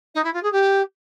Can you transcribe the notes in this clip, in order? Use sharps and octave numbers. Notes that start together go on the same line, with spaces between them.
D#4
E4
F4
G#4
G4